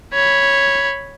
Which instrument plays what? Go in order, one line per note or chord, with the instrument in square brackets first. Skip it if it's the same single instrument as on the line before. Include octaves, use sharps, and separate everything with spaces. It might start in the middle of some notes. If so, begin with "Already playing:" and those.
[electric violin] C#5 B5